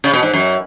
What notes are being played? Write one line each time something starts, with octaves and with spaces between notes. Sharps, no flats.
C#3
B2
G#2
F#2